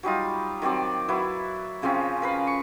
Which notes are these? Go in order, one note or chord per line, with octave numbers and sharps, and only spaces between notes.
F#3 G3 D#4 F4
D#3 F#3 C4 D5
F#3 E4 B4
C#3 F3 C4 C#4
A#4 B4 F5
C#6